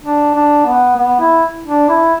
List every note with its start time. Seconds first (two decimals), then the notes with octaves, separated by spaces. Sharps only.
0.03 D4
0.34 D4
0.65 B3
0.97 B3
1.20 E4
1.66 D4
1.89 E4